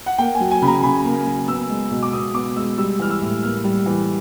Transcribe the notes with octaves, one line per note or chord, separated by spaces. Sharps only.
F#5
A#3 G5
G#5
F#3
G#5
C#3 B5
A#5
C#3 B5
A#3
F#3
B3 E6
G#3
B2
D6
B2 D#6
B3 D6
G#3 E6
G3 E6
E3 F6
E6
A2
A#3 F6
G3
E3